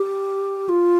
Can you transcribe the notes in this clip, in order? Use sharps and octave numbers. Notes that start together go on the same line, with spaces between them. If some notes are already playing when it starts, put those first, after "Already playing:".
Already playing: G4
F4